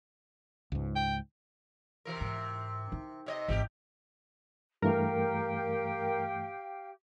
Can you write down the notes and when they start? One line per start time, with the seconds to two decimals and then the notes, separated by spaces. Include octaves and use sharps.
0.72 C#2 G#2
0.96 G5
2.05 C3 E3 A#4
2.20 G#2
2.92 D#4
3.26 C3 C#5 D#5
3.48 G#1 E3 G4
4.82 G2 E3 A3 G4 A#4 F5 G5